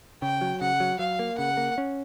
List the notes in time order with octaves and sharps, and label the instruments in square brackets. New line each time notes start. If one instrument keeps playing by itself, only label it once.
[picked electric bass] C#3 [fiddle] G5
[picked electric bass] F#3
[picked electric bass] C#3 [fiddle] F#5
[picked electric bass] F#3
[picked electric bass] F#3 [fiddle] F5
[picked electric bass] A#3
[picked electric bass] C#3 [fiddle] F#5
[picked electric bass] A#3
C#4